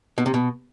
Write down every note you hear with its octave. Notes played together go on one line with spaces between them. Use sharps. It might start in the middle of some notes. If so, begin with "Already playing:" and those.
B2
C3
B2